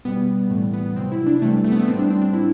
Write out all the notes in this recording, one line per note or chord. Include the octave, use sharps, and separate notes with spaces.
B2 G3 B3
A2 E3 G3 A3
B3
C3 F#3 C4
E4
D4
C3 E3 G3 A3
A3
B3
A3
A2 G3 C4
D4
C4
D4
A2 F#3 E4